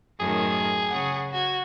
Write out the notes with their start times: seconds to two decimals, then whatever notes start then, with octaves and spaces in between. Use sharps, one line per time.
0.20 F#2 A2 D#3 G#4
0.88 C#3 F#5
1.30 F#4 G#6